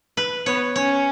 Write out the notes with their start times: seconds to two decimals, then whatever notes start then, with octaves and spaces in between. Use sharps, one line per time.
0.17 B4
0.46 B3 C#5
0.76 C#4 C#5